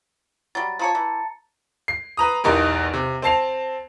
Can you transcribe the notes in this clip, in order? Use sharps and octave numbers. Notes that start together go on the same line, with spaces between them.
F#3 G3 A6
F3 G#4 C#5 A5 A#5 C#7
E3
C7
B4 A#5 D#6
B1 E2 D#4 G4 A#4
C3
C4 A5 C7 F7